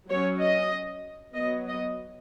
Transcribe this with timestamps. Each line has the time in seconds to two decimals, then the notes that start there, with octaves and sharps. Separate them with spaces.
0.09 F#3 C#4 C#5
0.40 D#5
1.35 F#3 B3 D#5
1.67 D#5